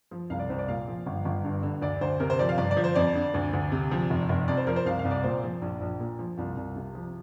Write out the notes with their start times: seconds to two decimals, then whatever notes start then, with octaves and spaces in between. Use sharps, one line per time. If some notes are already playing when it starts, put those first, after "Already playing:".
0.11 F3
0.30 C2 F5
0.39 D5
0.49 C2 C5
0.59 D5
0.68 A#2 F5
0.88 F3
1.06 G1
1.25 G1
1.44 G2
1.63 D3
1.82 D2 D5
2.01 D2 C5
2.20 C3 A#4
2.30 C5
2.39 F3 D5
2.49 F5
2.58 G1 D5
2.71 D5
2.77 F3
2.84 C5
2.95 F2 D5
3.15 D3
3.34 D2
3.53 D2
3.72 C3
3.91 F3
4.10 F1
4.29 F1
4.48 F2 D5
4.57 C5
4.67 F3 A#4
4.76 C5
4.85 C2 F5
4.99 F5
5.05 C2
5.11 D5
5.24 A#2 C5
5.43 F3
5.62 A#1
5.81 A#1
6.00 A#2
6.19 F3
6.37 C2 F4
6.57 C2
6.76 C3
6.95 F3